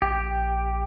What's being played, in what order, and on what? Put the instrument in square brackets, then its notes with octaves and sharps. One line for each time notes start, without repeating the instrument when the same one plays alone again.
[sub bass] A#1 [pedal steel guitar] G4